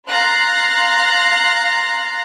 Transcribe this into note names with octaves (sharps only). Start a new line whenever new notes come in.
F5 A#5 C6 F#6 A6 C7